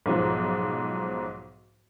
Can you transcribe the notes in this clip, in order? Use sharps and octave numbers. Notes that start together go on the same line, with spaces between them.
B1 G#2 F3